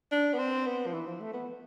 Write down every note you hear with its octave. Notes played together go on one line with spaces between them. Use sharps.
D4
B3
C4
B3
F3
E3
F3
A3
B3